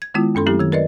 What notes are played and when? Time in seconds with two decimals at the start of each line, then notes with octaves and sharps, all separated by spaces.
0.02 G#6
0.14 D#3 G#3 B3 E4 F4
0.35 F#2 C#4 A4 C6
0.46 F#3 A3 C4 E4 G4
0.59 D#3 G#6
0.72 A#4 B4 D5 D#5